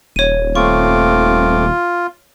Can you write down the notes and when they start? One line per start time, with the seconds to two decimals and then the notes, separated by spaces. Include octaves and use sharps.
0.16 D#1 C#5 D#7
0.55 A3 C4 F4 C#6 D6